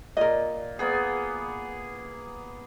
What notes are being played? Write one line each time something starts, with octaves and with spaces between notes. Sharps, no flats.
A#2 A#4 D#5
A#3 B3 G#4